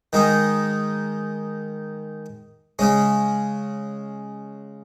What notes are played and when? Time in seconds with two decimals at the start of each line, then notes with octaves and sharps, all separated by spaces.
0.13 D#3 G#3 D#4
2.79 C#3 G#3 C#4